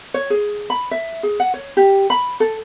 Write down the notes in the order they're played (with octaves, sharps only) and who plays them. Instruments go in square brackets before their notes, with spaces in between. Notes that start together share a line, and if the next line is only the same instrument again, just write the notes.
[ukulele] C#5
G#4
B5
E5
G#4
F#5
C#5
G4
B5
A4